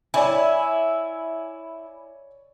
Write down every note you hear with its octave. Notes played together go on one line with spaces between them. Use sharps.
E4 C#5 D5 G#5